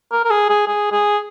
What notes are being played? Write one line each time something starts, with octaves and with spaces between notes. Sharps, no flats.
A#4
A#4
G#4
G#4
G#4
G#4